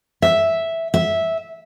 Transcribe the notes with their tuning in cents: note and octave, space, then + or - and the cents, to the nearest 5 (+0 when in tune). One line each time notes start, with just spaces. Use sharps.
E5 -5
E5 -10